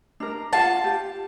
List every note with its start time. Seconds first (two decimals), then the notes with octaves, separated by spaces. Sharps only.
0.20 D4 A#4
0.53 F4 F5 F#5 A5
0.84 G4